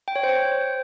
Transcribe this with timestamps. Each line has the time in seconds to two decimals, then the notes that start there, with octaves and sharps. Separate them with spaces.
0.08 G5
0.16 C#5
0.23 C5